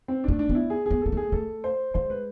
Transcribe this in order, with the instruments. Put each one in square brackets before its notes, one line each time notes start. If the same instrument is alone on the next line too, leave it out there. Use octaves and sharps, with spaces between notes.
[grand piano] C4
[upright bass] A3 [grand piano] D4
[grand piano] D4
[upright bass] B3
[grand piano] E4
G#4
[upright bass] B3 [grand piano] G#4
[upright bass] B3 [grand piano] A4
[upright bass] A3 [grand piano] G#4
[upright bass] A3 [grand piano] A4
[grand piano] C5
[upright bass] G#3 [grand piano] C5
[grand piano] B4